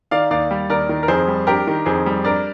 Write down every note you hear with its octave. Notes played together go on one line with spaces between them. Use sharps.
D#3 D5 F5
D#2 D5 F5
G3
D#2 A#4 D5
D#3
A#4
F2 G#4 C5
G3
D4 G4 A#4
D#3
F2 G#4 C5
G3
D4 A#4 D5